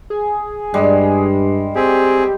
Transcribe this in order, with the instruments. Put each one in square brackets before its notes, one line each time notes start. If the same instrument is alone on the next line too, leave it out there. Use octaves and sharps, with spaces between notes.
[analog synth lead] G#4
[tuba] G2 [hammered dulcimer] G3 G#3
[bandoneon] C4 G#4 [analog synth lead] G4